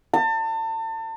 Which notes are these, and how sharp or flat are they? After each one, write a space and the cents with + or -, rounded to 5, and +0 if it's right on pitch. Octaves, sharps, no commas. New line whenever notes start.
A5 +35